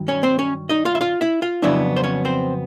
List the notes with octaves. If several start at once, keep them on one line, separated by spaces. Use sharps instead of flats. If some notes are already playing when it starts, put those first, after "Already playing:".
Already playing: G2 D#3 F#3
C#4 C#5
C4 C5
C#4 C#5
D#4 D#5
F4 F5
E5
F4 F5
E4 E5
F4 F5
F2 C#3 F#3 B3 D4 E4 E5
C5
C#4 C#5
C4 C5